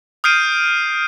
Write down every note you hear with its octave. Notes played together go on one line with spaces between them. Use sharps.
D#6 F6 G6 C7 D7 D#7